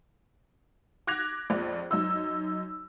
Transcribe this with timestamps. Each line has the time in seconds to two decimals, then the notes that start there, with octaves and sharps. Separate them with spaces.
1.07 D6 F#6 G#6 A#6 F7
1.50 A#1 F2
1.91 F#2 D#4 E6